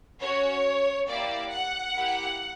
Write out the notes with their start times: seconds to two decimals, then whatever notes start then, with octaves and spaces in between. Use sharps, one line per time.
0.21 C#4 F#4 C#5
1.08 A#3 E4 G4 D5
1.50 F#5
1.94 A#3 E4 G4